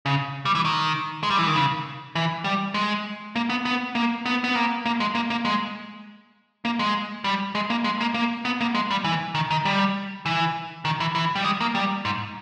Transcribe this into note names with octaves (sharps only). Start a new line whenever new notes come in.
C#3
G3
E3
D#3
G#3
G3
E3
D#3
C#3
E3
G3
G#3
A#3
B3
B3
A#3
B3
B3
A#3
A#3
G#3
A#3
A#3
G#3
A#3
G#3
G3
G#3
A#3
G#3
A#3
A#3
B3
A#3
G#3
G3
E3
D#3
D#3
G3
E3
D#3
E3
E3
G3
G#3
A#3
G3
G#2